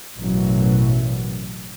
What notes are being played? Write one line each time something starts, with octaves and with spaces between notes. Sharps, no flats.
A1 F#2 B2 E3 F#3